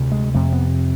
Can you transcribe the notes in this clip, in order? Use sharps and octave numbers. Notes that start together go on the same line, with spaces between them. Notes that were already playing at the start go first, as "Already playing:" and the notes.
Already playing: D2 C3
G#3
F2 C3 A3
B3